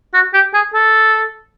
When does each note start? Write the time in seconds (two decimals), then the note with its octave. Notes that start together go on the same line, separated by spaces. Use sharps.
0.14 F#4
0.34 G4
0.54 G#4
0.74 A4